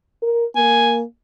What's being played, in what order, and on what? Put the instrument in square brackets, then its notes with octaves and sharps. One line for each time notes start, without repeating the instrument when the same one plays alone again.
[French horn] A#4
[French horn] A#3 [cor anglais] G#5